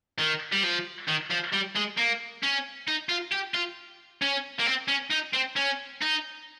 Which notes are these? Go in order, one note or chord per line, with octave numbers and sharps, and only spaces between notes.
D#3
G3
F3
D#3
F3
G3
G#3
A#3
C#4
D#4
F4
G4
F4
C#4
A#3
C4
C#4
D#4
C4
C#4
D#4